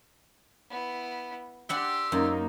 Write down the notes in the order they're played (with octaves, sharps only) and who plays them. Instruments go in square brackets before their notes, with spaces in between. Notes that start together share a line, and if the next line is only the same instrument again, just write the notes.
[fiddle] B3 E4
[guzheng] D4 F#5 G5 [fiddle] G4 C6 [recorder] E6
[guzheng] F#2 [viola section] A#3 D#4